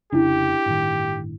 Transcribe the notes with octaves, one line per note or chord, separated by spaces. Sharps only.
F1 C#3 C#4 D4 E4 G4
G1 A2 D#3